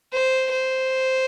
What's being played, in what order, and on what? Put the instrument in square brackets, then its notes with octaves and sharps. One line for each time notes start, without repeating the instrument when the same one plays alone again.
[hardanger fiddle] C5
C5